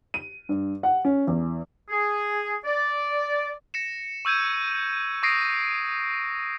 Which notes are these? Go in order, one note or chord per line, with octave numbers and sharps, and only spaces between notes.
D#7
G2
F#5
C#4
E2
G#4
D5
A#6 C#7 E7
C#6 E6 G6 G#6 D#7
C#6 D#6 A#6 C7 D7